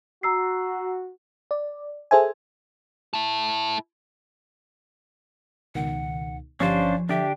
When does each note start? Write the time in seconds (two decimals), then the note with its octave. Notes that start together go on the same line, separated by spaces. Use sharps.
0.23 F#4 A#5 E6 C7
1.51 D5
2.11 G#4 A4 C5 E5 G#5
3.14 E4 A4
5.75 C#2 B2 D#3 F#5
6.60 G1 F3 C#4 D4 G4 C5 F5
7.09 D3 D4 G4 E5